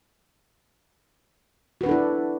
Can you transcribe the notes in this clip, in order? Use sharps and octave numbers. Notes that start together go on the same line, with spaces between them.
D4 E4 F#4 A4 B4